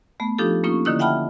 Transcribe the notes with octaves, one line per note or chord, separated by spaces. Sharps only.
A3 B3
F3 D4 D#4 F4 G4 A4
A#3 C#4 D#4 F4 C#6
D3 D#3 A#3 E4 D#6 F#6
E5 F#5 G5 A5 B5 F6